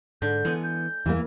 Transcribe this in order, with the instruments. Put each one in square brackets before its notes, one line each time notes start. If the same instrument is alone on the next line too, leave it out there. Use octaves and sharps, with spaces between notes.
[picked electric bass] G#2 [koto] D3 [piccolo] G6
[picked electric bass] E3 B3 [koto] G#3
[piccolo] G6
[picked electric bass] E2 [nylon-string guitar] E3 A#3